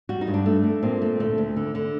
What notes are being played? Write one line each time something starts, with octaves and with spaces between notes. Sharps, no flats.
G3 F#4
D#4
G2
D4
A3
A3
A#2 C4
A3
D2 A3
D2
D3
D3